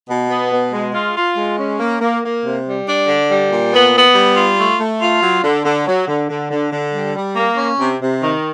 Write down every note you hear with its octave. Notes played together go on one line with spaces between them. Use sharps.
B2
B3
B2
G#3
F4
F4
G#3
C#4
A#3
A#3
A#3
C3
G3
D4
D3
G3
A#2
B3
B3
G3
F4
A3
A3
F4
F#3
D3
D3
F#3
D3
D3
D3
D3
G3
G3
A#3
C#4
C3
C3
D#3